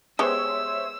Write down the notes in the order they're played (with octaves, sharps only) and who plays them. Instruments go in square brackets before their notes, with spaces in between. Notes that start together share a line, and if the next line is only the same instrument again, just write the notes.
[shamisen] G#3 B3 G4 [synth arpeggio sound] C5 C#5 E5 [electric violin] E6